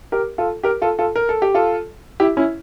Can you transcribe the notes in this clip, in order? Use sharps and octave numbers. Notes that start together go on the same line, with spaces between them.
G4 A#4
F4 A4
G4 A#4
F4 A4
F4 A4
A#4
A4
G4
F4 A4
E4 G4
C#4 E4